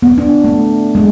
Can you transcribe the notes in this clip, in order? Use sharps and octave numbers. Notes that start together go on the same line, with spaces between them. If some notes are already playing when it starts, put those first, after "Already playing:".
B3
D4
A3
G#3